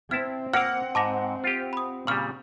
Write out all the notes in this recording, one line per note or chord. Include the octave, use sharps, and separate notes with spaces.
C4 E4 A5 F6
A#3 A#4 F#5 E6 F6
G#2 A5 D6 A#6
F4 G4
B5 D#6
A#2 C#3 G3 F6 F#7